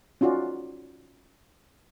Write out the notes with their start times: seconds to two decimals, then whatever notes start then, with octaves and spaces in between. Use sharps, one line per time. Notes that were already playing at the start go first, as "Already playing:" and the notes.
0.21 C#4 D#4 F4 F#4 D5